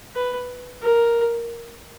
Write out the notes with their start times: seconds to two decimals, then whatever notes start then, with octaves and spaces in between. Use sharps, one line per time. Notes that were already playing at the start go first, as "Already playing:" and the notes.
0.15 B4
0.82 A#4